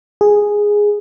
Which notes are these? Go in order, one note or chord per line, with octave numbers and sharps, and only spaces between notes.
G#4